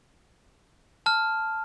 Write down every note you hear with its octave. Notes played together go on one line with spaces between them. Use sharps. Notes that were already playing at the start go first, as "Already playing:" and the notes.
A5 F6